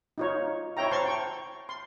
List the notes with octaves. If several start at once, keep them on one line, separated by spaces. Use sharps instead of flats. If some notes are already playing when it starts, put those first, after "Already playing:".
D#4 F4 C#5
E4 C#5 E5 G5 A#5
C5 A5 C6 C#6
G5 C#6
C6